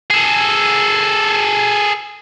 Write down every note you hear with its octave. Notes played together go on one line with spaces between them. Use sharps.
G#4 A4